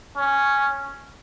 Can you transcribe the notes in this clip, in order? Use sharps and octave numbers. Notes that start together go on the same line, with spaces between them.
C#4